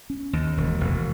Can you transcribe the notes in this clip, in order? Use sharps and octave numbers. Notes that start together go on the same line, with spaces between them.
C#4
D#2
E1
E1